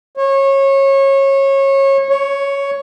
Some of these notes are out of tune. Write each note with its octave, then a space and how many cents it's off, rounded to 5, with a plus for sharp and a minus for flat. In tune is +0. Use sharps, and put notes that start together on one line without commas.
C#5 -25
C#5 +5